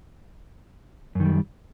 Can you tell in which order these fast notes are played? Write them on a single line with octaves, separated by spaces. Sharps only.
F#2 D#3 G3